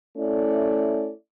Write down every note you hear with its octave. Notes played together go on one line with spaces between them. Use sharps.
A3 C#4 E4 A4 D5